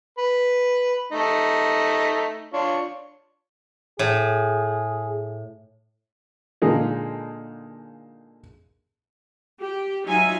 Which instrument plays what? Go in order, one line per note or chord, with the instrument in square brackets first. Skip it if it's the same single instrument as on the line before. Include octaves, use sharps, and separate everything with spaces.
[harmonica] B4
A3 D#4
D4 F4 C#5
[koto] A2 [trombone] G#4
[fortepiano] A#2 D3 G#3 A#3 D#4 G#4
[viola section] G4
F#3 D#4 F4 E5 G#5